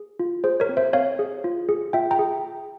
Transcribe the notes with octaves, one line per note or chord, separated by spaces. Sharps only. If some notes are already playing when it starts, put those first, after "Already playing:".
Already playing: G#4
F4
G#4 C5
A#4 C#5
C4
C5 E5
C4 C#5 F5
G#4
F4
G#4
F4 E5 G5
G5 A#5
G#4